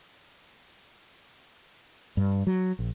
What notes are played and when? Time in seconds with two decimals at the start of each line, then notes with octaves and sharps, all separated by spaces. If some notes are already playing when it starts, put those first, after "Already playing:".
2.17 G2
2.47 F#3
2.79 A#1